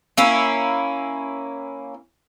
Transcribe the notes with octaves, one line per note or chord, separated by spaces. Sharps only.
A#3 C#4 E4